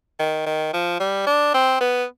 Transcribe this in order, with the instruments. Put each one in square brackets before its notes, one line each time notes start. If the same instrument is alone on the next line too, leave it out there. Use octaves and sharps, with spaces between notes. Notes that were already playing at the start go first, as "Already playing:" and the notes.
[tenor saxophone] D#3
D#3
F3
G3
D4
C4
B3